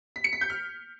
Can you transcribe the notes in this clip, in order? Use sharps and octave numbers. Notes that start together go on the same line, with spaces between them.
B6
C#7
B6
G6
F6